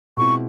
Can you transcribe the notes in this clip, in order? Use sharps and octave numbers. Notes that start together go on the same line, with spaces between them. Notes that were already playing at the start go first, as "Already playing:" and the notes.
B2 G#3 C4 E4 C#6